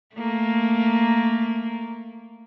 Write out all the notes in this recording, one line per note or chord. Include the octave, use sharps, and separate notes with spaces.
A3 A#3